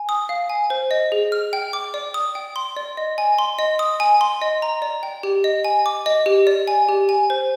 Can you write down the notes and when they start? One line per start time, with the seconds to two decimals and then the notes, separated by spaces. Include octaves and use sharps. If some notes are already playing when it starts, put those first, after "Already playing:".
Already playing: G#5
0.09 D#6
0.29 F5
0.49 G#5
0.70 C5
0.91 D#5
1.12 G#4
1.32 F6
1.53 G5
1.73 D6
1.94 D5
2.14 D#6
2.35 G5
2.56 C6
2.76 D5
2.97 D#5
3.18 G#5
3.38 C6
3.59 D#5
3.79 D#6
4.00 G#5
4.21 C6
4.42 D#5
4.62 A#5
4.82 D5
5.03 G5
5.23 G4
5.44 D#5
5.65 G#5
5.86 D6
6.06 D#5
6.26 G4
6.47 D5
6.68 G#5
6.89 G4
7.09 G#5
7.30 C5